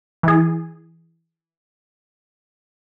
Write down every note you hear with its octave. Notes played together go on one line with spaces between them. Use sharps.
E3 G#4